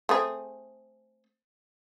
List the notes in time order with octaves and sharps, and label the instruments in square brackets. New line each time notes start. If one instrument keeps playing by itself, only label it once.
[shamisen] A3 C4 G#4